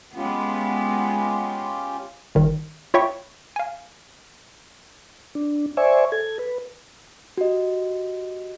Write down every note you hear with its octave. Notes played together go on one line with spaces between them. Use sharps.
G#3 B3 C#4 F4 G4
G1 D#3 G3
F4 C#5 E5 G5 B5 C#6
F5 G#5
D4
C5 D5 E5 G#5 C#6
A4 G#6
B4
F#4 G4 D#5